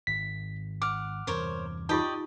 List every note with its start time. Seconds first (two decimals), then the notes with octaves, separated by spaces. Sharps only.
0.07 G#1 B6
0.82 F#5 D6 F6
1.27 E2 G2 C3 A#4 C5 C#5
1.89 D#4 F4 G4 D5 D#5 G5